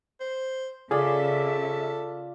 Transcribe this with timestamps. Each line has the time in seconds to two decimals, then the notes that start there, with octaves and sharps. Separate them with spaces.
0.20 C5
0.91 C#3 F4 G#4 A4 D5 E5